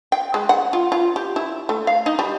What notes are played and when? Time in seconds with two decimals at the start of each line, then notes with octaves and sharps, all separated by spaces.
0.12 G5
0.34 G#3
0.49 F#5
0.73 F4
0.92 F4
1.16 G4
1.36 E4
1.69 A3
1.87 F5
2.06 D#4
2.19 G3